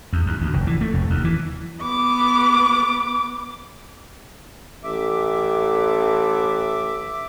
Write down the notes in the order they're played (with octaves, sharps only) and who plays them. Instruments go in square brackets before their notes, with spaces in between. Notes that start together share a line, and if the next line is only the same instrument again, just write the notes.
[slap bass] E2
D#2
D2
F1
E3
A3
F1
D#2
E3
[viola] B3 D6
[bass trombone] A1 [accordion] E5 D6